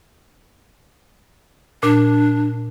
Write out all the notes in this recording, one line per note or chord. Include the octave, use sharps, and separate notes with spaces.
A#2 D4